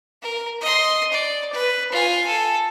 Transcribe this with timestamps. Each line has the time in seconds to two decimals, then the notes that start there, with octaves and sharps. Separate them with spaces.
0.22 A#4
0.61 D#5 C6
1.12 D5
1.53 B4
1.92 F4 G#5
2.27 A4